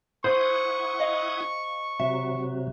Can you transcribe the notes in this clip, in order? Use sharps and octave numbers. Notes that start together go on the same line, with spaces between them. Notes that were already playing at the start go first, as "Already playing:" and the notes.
E4 C5 F#5 C#6 D#6
D#5 F5
C3 F#3 E5